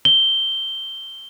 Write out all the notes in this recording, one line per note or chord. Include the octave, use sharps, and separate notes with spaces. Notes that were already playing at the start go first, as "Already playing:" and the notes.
G7